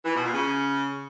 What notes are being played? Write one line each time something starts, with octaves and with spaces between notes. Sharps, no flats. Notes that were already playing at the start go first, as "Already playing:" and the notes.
E3
B2
A#2
C#3